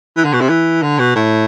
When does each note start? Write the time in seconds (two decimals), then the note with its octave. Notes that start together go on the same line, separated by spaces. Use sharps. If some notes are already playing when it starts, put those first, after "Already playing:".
0.16 E3
0.24 D3
0.33 B2
0.41 C3
0.49 E3
0.82 D3
0.99 B2
1.16 A2